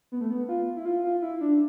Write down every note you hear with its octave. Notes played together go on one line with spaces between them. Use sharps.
B3
A3
B3
F4
E4
F4
F4
E4
D4